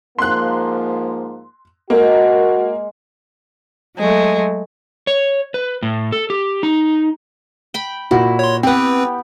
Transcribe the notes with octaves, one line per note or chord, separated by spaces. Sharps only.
G#2 F3 A#3 C6 F#6
G#3 A#3 F#4
F#3 G#3 A3
C#5
B4
A2
A4
G4
D#4
G5 B5
A#2 E4 F#4
C#5 C6
B3 C4 G4 B4 G5